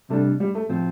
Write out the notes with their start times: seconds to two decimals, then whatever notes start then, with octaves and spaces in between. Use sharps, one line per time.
0.10 C3 G3 A3 D4
0.40 G3
0.55 A3
0.69 A2 F3 C4 F4